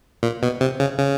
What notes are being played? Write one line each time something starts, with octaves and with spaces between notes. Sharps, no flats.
A#2
B2
C3
C#3
C#3